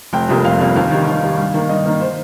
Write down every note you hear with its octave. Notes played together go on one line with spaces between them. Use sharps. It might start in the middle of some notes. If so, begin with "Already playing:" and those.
F1 G5
F2 C3 G3 A#3
F1 F5
F2 C3 G3 A#3
D#2 F5
D#3 G3
D#2 F5
D#3 G3
G2 F5
D#3 A#3
G2 D#5
D#3 A#3
C5